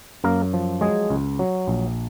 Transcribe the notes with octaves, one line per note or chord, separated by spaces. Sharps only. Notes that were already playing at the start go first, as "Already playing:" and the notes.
F#2 A#3 A#4
F3
F#3 G#3 G#4
C#2
F#3
A#1